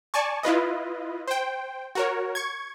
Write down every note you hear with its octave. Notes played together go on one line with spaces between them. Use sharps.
D5 G#5 A5 C#6
E4 F4 B4 D#5
C5 G5
F#4 A#4 C#5
C#6 G#6